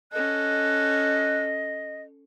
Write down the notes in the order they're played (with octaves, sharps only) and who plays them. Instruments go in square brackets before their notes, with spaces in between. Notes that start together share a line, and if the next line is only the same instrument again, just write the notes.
[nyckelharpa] C#4 A4 [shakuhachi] D#5 [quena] F#6